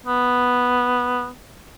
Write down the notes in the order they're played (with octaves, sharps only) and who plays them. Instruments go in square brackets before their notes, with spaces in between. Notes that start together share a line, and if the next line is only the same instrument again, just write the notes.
[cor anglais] B3